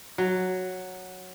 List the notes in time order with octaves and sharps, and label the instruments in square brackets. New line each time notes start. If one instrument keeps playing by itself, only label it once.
[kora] F#3